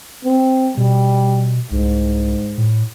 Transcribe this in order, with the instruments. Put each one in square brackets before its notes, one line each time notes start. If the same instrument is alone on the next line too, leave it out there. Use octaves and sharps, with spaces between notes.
[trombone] C4
[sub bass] B2 [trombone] G3
[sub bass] C2 [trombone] G#2
[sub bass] A2